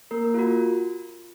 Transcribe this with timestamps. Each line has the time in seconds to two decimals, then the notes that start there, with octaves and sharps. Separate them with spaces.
0.11 A#3 A#4
0.34 F4
0.39 F#4